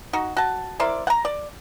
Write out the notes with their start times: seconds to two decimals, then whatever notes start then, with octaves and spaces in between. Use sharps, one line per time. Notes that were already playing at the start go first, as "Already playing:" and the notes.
0.13 D#4 F#4
0.37 F#4 A5
0.80 E4 A#4 C5 D5
1.07 F#5 A#5
1.25 D5